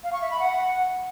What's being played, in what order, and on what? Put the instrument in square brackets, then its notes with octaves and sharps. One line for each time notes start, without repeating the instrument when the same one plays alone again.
[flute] F5
C#6
E5
B5
F#5